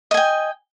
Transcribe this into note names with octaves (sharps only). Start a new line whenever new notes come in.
D#5 G5 G#5